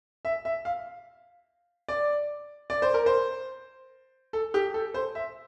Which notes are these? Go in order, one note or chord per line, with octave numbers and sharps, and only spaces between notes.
E5
E5
F5
D5
D5
C5
A#4
C5
A4
G4
A4
C5
E5